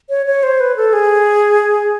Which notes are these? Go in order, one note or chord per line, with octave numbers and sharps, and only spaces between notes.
C#5
C#5
C5
B4
A4
G#4